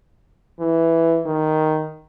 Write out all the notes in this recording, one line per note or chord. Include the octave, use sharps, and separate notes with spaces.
E3
D#3